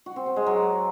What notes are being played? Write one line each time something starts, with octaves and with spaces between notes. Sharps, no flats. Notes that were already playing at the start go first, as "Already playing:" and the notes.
F#4
C4
C4
G#3
F#3